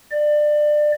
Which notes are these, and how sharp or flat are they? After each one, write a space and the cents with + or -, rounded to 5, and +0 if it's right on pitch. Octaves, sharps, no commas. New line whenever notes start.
D5 +25